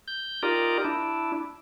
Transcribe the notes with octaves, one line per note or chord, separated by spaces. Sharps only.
G6
D#4 F4 G4 A#4 D5
D4 E4